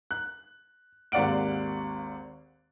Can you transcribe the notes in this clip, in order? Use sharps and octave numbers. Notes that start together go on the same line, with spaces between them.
F#6
G#1 D#2 D5 F5 F#5 D7